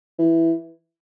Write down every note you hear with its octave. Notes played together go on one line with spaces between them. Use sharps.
E3